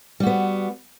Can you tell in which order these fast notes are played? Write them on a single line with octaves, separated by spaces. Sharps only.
G3 F#4 B3